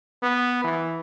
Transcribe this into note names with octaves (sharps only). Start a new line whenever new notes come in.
B3
E3